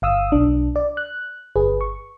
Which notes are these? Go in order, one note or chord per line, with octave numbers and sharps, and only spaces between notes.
G1 F5 D#6 E6
B1 D4
D5
F#6
G1 G#4 B4
C#6